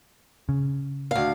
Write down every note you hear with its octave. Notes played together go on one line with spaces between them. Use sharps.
C#3
D2 F5